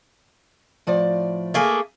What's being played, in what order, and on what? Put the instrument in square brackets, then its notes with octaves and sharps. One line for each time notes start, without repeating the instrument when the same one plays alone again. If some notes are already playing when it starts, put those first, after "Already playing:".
[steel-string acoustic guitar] A2 F3 D5
[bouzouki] A3 A#3 G#4